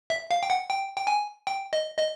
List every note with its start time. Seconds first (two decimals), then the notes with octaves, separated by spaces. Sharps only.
0.10 E5
0.31 F5
0.43 G5
0.50 F#5
0.69 G5
0.97 G5
1.07 G#5
1.47 G5
1.73 D#5
1.99 D#5